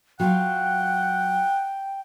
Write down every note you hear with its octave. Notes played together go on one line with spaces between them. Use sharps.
F#3 F4 F#5 G5